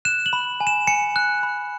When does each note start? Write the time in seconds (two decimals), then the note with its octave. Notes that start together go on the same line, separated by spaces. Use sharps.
0.05 F#6 E7
0.26 F#7
0.33 B5
0.60 G#5
0.67 E7
0.87 G#5 C#7
1.16 F#6
1.43 B5